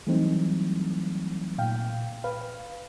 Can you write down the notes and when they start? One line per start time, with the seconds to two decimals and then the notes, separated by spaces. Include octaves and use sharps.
0.07 E3 F#3 G3 A3 C4 D#4
1.58 A#2 F5 G5
2.24 B4 F5